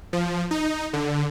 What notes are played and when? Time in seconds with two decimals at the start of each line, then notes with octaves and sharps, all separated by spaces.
0.13 F3
0.51 D#4
0.93 D3